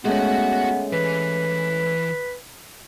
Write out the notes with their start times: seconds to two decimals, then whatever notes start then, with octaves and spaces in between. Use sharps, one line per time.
0.05 G#3 A3 B3 C#4 F#4 F#5
0.93 E3 B4